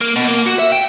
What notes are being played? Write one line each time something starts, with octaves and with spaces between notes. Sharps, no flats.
A#3
B2
A#3
F#4
E5
G5